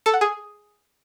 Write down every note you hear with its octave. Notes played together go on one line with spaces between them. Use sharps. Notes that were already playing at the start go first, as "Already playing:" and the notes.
A4
F#5
G#4